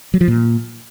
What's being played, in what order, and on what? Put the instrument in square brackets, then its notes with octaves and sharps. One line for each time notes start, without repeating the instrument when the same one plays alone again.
[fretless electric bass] F#3
F3
A#2